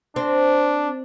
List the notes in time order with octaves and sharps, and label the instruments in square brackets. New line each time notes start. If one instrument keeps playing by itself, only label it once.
[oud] C4 [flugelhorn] D4